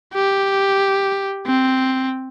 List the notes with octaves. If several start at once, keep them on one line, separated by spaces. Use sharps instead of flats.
G4
C4